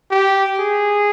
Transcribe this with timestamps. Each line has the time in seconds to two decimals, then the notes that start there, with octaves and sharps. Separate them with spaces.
0.11 G4
0.59 G#4